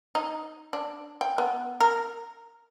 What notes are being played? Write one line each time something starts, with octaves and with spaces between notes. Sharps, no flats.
D#4
D4
G5
B3
A#4